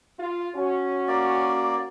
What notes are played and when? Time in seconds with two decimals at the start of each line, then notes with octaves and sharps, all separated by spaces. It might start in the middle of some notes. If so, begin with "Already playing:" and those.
0.19 F4
0.55 C#4 F#4
1.08 A#3 D5